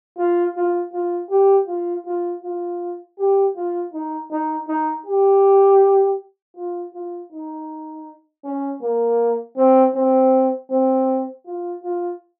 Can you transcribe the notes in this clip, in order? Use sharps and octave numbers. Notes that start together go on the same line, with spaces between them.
F4
F4
F4
G4
F4
F4
F4
G4
F4
D#4
D#4
D#4
G4
F4
F4
D#4
C#4
A#3
C4
C4
C4
F4
F4